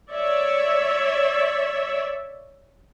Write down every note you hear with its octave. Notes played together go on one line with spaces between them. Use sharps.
C#5 D5 E5